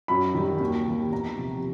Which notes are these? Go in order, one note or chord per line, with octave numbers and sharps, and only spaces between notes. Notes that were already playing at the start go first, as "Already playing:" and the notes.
F#2 B5
D#3 G3
D#2
D#3 G3 A#3
E2 A#5
C3 F3